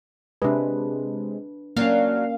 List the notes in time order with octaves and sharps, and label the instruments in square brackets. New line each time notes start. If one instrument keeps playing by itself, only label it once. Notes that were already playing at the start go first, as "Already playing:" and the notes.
[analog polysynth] C3 G#3 [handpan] D4 B4
[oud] F#3 D4 [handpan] A#3 C#4 [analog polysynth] F5